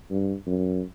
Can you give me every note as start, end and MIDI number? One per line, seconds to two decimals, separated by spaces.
0.11 0.34 43
0.47 0.81 42